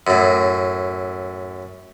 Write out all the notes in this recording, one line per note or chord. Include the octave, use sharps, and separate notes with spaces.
F#2 A2